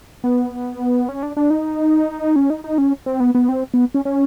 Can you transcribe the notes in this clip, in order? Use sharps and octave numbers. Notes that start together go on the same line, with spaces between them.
B3
C#4
D4
D4
D#4
C#4
D#4
D#4
C#4
C4
B3
B3
C4
B3
C#4
C#4